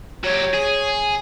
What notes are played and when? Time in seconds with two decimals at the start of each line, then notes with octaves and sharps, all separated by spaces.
0.24 F#3 G4 C#5
0.54 G#4